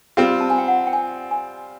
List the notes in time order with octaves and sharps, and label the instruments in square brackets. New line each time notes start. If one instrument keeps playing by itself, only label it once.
[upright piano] G3 C4 F4 [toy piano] G5
[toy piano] A5
G#5
G5
F#5
G5
G#5
G#5